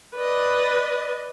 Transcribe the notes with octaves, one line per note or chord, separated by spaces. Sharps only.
B4 D5 D#5